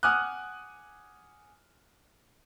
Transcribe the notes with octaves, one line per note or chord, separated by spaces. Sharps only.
F#5 G#5 D6 D#6 F6 F#6